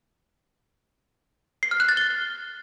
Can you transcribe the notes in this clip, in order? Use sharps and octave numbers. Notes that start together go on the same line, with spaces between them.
C7
F6
F#6
A6
G7